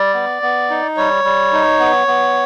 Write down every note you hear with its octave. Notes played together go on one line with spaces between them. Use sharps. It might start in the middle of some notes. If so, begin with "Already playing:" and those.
Already playing: G3 D5
B3
B3
D#4
G3 C#5
G3
D#4
B3
B3